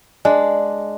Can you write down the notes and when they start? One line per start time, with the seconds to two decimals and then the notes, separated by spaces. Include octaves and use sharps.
0.25 G#3 D4